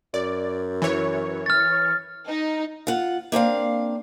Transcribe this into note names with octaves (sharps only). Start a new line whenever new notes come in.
F#2 D5
E3 C#5
F6 A6
D#4
F4 F#5
A#3 C4 D4 F5